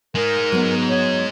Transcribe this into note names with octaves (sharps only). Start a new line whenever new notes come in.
G#3 D#4 A#4
F#3 B3
C#5